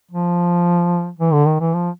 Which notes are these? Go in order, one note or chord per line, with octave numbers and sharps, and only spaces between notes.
F3
E3
D3
D#3
E3
F3